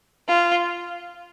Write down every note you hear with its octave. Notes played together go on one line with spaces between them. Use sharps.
F4